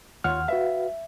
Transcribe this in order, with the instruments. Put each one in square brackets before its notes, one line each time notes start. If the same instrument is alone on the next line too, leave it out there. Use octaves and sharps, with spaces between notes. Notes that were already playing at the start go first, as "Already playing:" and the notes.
[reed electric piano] D#2 F#5 F6 [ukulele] F4 C#5
[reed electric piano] F#4 B4 F5 [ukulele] E5